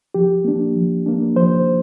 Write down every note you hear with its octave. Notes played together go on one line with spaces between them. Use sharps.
F3 G4
A#3 D4
F3
A#3 D4
F3 C5